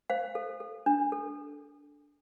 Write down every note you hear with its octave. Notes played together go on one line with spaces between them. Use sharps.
C5 F5
A4
A4
D4
A4